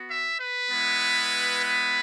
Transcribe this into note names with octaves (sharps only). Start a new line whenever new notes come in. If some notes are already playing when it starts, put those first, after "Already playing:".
Already playing: B3 F#4
E5
B4
G#3 B3 E4
B4